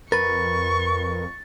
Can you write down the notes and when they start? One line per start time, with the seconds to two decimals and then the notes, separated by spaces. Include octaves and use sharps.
0.12 F2 A#4 B4 C#6 A6